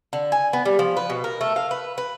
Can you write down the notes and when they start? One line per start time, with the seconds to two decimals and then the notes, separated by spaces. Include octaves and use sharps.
0.13 D3
0.32 G#5
0.53 B3
0.65 G3
0.79 F3
0.97 B4
1.10 B2
1.24 A#4
1.41 A3
1.56 F5
1.71 B4
1.98 B4